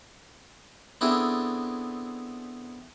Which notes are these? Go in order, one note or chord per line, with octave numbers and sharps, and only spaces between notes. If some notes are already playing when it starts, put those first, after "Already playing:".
B3 C4 D4 E4 G#4 A4